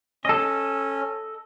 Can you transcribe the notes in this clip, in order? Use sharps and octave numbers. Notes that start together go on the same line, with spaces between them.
C#4 A4 D#5